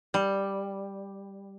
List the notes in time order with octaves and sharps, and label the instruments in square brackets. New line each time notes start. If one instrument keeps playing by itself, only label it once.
[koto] G3